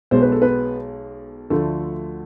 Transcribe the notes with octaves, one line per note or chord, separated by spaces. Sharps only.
B1 B2 G#3 C5
B4
A4
B3 B4
D2 D3 F3 A3 A4